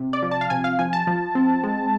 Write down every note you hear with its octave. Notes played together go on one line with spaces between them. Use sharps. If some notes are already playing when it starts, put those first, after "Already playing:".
Already playing: C3
D5
F3
A5
F5
C3 G#5
F5
F3 G#5
A5
F3
C4
G#3